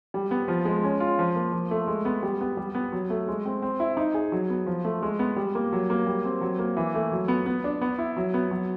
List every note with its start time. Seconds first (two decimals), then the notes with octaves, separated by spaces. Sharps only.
0.14 G3
0.31 B3
0.48 F3
0.65 G#3
0.84 C#4
1.00 F4
1.19 F3
1.36 A#3
1.53 F3
1.71 A3
1.87 G#3
2.05 B3
2.23 G3
2.41 B3
2.57 G3
2.75 B3
2.92 F#3
3.10 A3
3.28 G#3
3.45 C4
3.62 C4
3.80 E4
3.97 D#4
4.14 G#4
4.32 F#3
4.50 B3
4.67 F3
4.85 A3
5.03 G#3
5.19 B3
5.36 G3
5.55 A#3
5.72 F#3
5.90 A#3
6.07 G3
6.25 C4
6.41 F#3
6.59 A#3
6.77 E3
6.95 A3
7.12 F#3
7.28 B3
7.46 B3
7.64 D4
7.81 B3
7.98 E4
8.17 F#3
8.34 B3
8.51 F#3